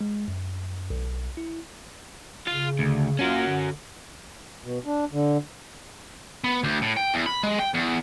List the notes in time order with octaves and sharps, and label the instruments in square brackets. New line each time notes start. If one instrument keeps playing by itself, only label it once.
[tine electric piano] G#3
F#2
B1
E4
[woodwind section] C#3 [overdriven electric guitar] F4 F5
[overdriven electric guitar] D2
[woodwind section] A#3 F4 [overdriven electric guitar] C#4 F#4
[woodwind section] D3
[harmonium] B2
D4
D3
[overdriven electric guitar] B3
D2
A2
G5
E2
B5
G#3
G5
E2